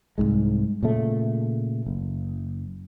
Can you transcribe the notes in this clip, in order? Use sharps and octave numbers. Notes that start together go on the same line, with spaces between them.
C2 F2 G#2 G#3
A#2 C#3 A3
F#1